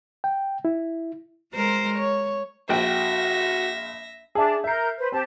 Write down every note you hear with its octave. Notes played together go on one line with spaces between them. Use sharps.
G5
E4
G#3 A#4 C5
C#5
A#1 F#4 E5 G5 A#6
D4 G#4 E5 A5
A#4 E5 G6 C7
B4 C5
C4 G4 A5